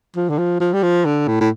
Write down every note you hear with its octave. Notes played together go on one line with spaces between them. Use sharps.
F3
D3
F3
F3
G3
F3
D3
A2
A2